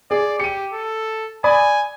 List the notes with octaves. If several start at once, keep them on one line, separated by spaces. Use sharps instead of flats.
G#4 D5
G4 C#7 D#7
A4
D5 G#5 B5 D#6